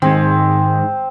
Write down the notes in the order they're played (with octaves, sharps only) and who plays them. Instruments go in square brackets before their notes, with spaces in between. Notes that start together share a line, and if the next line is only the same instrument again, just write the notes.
[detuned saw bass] G#2 [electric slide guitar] D#3 G#3 [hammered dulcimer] C4